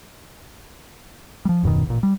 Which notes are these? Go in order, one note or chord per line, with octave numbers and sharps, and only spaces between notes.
F3 G3
D#1 F#2 B2 D#3
A1 A#2
G3